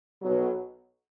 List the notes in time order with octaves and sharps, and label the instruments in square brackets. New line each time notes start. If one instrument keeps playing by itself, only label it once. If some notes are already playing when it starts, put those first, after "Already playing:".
[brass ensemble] B1 B2 F#3